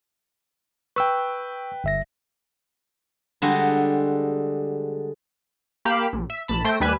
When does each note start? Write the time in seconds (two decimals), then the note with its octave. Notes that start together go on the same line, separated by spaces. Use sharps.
0.96 B4 G5 C#6 E6
1.84 G1 E5 A#6
3.42 D3 G3 G#3 F#4
5.85 A#3 G4 F5 B5 D7 E7
6.13 A#1
6.30 E5
6.48 A#1 A5 B5
6.64 A3 C5 G5 A#6
6.80 D#2 G3 B4 G#5 E7